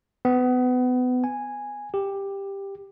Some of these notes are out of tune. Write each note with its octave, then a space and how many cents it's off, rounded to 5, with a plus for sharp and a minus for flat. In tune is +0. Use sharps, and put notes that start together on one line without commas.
B3 +25
G#5 -5
G4 +10